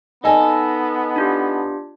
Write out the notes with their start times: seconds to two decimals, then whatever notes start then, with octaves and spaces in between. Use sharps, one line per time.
0.24 B3 D#4 A4 D#5 G#5
1.16 D4 F4 G4